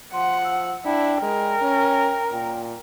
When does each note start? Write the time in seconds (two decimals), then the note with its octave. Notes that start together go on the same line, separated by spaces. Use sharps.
0.14 F3 F#5 C6
0.44 E6
0.85 D4 E4 G5
1.22 G#3 A#4
1.62 C#4
2.32 A#2 G5